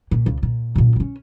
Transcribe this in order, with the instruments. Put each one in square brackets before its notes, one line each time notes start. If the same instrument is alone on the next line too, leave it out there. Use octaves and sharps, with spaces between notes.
[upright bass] A#2
C#2
A#2
F#2 A#2
C4 C#4